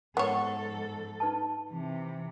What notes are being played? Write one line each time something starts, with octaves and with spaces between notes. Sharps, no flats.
G#2 B3 A4 C#5 F#5
D#4 B4 A5
C3 E3